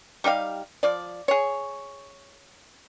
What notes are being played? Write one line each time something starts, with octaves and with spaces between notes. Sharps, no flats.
G3 D#4 G4 F5
F3 D5
G#4 C#5